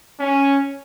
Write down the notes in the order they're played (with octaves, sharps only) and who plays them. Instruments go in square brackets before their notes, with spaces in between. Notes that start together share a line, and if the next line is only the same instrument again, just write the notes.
[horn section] C#4